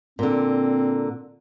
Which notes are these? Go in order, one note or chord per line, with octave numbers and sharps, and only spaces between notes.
A#2 D3 C4